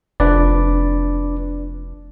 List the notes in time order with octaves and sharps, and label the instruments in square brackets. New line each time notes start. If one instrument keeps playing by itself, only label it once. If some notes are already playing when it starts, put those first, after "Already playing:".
[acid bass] F1 [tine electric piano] D4 B4 D5